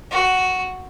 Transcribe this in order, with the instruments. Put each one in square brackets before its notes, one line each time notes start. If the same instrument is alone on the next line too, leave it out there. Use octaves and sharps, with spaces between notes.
[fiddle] F#4